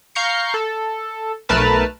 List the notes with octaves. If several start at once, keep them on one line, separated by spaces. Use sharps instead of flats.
F5 A#5 C#6 G6 C7 C#7
A4
B1 A3 A#4 B4 A5 F6